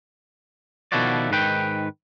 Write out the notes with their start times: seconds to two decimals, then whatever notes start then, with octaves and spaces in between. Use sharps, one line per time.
0.92 B2 D#3 F3 E4 F#4 D5
1.31 G#2 D#3 B4 G5